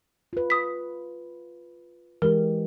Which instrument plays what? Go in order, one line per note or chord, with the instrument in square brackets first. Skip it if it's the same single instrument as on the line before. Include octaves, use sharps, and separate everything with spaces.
[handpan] F4 B4
[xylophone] D#6 B6
[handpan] E3 G#3 G4 [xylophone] A#4